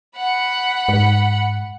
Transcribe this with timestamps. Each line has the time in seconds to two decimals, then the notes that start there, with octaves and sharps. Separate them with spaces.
0.16 F#5 B5
0.89 G#2